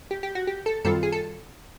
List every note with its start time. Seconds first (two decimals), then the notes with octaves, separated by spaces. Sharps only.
0.11 G4
0.23 G4
0.35 F#4
0.47 G4
0.66 A4
0.84 F#2 D#3 G3 C4 F4 A4
1.03 G#4
1.12 A4